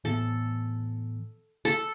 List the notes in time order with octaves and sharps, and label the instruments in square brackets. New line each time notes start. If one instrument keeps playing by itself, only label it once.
[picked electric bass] A2 E3 B3 [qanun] A4
[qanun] A4